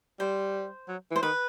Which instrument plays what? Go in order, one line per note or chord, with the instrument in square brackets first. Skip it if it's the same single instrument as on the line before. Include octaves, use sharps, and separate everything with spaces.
[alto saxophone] G3 [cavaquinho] C5
[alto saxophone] F#3
E3
[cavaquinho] C5
[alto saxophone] D#3 [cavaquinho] B4